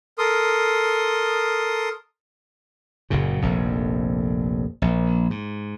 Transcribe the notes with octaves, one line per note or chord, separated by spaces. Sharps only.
A4 A#4 C6 D#6
F#1 F#2 A#2 C#3
F1 A#1 F2
A#1
G#2